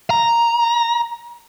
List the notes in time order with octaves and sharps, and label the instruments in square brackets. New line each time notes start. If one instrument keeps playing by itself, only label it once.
[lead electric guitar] A#5